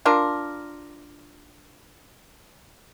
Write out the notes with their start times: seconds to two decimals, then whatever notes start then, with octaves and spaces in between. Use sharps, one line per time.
0.05 D4 F4 A#4